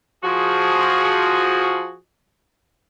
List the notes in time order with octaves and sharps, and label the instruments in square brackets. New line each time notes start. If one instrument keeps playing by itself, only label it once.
[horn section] F3 F#4 G#4